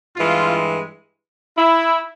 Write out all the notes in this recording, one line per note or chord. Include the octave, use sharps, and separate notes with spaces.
G2 E3 G#3 F4
E4